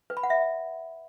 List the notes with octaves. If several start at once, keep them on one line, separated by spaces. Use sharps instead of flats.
B4
B5
F#5
E5